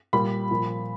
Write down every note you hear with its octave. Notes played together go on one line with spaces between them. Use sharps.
A#2 G3 B5
A#2 F3